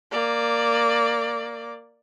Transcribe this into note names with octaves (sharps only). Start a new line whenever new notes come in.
A#3 D5